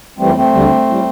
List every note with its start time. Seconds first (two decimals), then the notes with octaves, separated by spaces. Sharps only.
0.18 F#2 E3 G3 A3 C4
0.35 A3 C4
0.53 D2 D3 G3
0.86 A2 G3